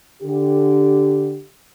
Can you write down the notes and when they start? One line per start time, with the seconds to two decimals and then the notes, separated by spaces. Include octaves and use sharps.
0.22 D3 G4